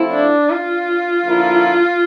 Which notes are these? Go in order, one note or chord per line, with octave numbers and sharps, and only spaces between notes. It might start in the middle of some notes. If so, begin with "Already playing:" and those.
Already playing: F3 A3 C4 E4
D4
F4
D3 F3 A#3 E4